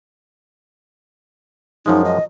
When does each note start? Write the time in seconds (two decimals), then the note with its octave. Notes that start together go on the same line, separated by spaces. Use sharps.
1.86 F#2 F3 G#3 D#4
2.05 D#5